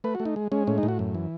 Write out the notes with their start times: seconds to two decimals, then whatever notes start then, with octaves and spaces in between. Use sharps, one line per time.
0.04 A3 B4
0.15 F#4
0.20 A3
0.25 D#4
0.36 G#3
0.52 G#3 C#4
0.67 A2 C#4
0.78 D#4
0.83 A2
0.88 F#4
0.99 F#2
1.15 E3